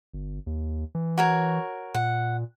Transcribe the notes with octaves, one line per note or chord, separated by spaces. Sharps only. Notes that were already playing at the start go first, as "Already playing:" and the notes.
G1
D#2
E3
F#4 A#4 C#5
A#2 F#5